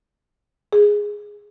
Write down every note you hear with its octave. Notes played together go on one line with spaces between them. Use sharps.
G#4